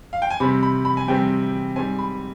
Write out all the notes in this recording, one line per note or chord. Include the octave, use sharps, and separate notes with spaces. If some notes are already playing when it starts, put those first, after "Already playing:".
F5
G5
G#5
C3 G3 C4 B5
B5
B5
G#5
C3 G3 C4 G5
G#2 G3 C4 G#5
B5